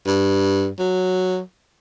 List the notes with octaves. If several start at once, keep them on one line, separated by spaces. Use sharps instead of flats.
G2
F#3